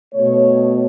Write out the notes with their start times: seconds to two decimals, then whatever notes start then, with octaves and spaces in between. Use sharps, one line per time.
0.14 B2 A3 C#5